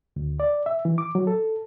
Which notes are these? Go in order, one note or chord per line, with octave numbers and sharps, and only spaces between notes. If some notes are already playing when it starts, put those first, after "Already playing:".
D2
D5
E5
E3
D6
F#3
A4